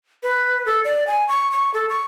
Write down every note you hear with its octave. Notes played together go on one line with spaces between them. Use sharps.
B4
A4
D5
G#5
C#6
C#6
A4
C#6